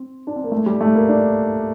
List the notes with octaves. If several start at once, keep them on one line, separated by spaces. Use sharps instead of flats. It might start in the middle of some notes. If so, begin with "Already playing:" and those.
Already playing: C4
D4
C4
A#3
A3
G3
A3
A#3
D4